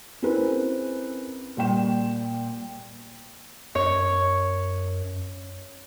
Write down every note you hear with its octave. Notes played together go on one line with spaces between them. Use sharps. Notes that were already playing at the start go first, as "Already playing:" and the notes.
C4 C#4 E4 G#4 A#4 B4
A#2 G3 G5 E7
F#2 C#5